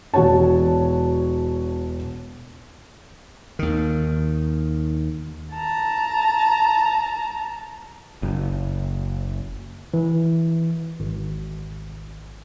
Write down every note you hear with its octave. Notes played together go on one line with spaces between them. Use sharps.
E1 F#4 C#5 A5
D#2 D#3
A5 A#5
F#1
E3
G#1